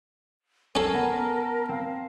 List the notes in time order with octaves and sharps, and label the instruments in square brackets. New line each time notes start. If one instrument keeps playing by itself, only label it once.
[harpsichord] C#4 A4 [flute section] A#4 [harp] G#5 A5 C7
[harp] B3
[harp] C4 [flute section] F5